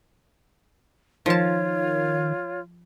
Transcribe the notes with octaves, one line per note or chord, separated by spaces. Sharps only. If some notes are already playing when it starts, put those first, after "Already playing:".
D#3 F3 F4 C#5 A5